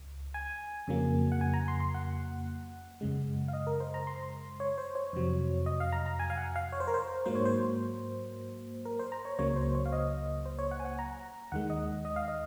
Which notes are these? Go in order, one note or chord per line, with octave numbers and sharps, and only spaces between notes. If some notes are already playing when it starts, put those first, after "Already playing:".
Already playing: C#2
G#5
F2 C#3 F#3 A#3
F#5
G#5
A#5
C6
C6
F#5
F#2 C#3 G#3
F5
D#5
A#4
C5
A#5
C6
C#5
C5
C#5
F2 C3 F#3
D#5
F5
A#5
A#5
G#5
F5
F#5
F5
C#5
C5
A#4
C5
G#2 F#3 A#3 C5
C#5
C5
A#4
C5
A#5
C#5
C#2 C#3 F#3 A#3 C#5
C5
C#5
F5
D#5
C5
C#5
F#5
G#5
F#5
A#5
D#2 D#3 G#3 F#5
D#5
D#5
F5
D#5